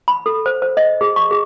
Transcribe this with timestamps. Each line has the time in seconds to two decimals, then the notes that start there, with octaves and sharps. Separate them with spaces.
0.08 B5
0.26 A4
0.46 C5
0.62 C5
0.77 D#5
1.01 G#4
1.16 C#6
1.31 G#4